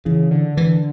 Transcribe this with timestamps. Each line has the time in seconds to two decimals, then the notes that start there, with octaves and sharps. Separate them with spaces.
0.05 C#3 E3
0.31 D3
0.57 D3 E3